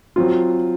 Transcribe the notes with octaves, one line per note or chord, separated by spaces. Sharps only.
F#3 C4 F4